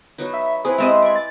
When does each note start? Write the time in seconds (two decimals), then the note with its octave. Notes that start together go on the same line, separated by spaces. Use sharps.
0.18 F#3 B3 D#4
0.33 E5
0.65 C4 E4 G#4 B4
0.78 G#3 C4 G4 B4 D#5 E5
1.02 D5 G#5
1.16 A6